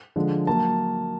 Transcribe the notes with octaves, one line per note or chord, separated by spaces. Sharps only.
D3 F3 G#3
F#3 A#3 A5